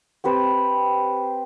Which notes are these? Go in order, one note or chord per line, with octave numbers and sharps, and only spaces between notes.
C4 G4 B4 C5